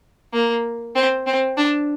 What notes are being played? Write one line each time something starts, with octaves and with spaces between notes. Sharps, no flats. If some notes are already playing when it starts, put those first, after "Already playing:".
A#3
C4
C4
D4